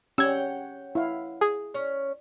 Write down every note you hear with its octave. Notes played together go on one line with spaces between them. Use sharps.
C#4 G4 C#5 F#5 G5 E6 G#6
E4 F5
G#4
C#4